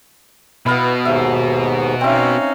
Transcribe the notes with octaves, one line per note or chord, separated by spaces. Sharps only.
B2 B3 E4 F5 B5
D#2 G#2 E5
C4 C#4 D#4 E5 F5